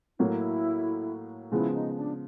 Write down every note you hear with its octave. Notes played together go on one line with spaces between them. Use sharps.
A2 F#3 A#3 E4
C#3 F3 G#3 B3 E4
D#4
D4